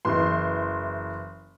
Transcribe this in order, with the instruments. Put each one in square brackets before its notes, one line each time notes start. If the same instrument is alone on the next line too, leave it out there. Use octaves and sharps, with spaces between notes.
[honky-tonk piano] F#1 E3 C6